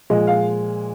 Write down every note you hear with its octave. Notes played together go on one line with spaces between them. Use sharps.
A#2 F3 G#3 D#5
F5